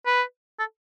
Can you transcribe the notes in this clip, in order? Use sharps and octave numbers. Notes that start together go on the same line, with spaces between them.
B4
A4